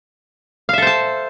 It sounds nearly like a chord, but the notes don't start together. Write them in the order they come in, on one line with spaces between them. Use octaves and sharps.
F5 E5 A4 C5 A5